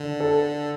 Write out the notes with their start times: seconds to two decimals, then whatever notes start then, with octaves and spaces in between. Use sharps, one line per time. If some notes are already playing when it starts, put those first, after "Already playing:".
Already playing: D3
0.20 A4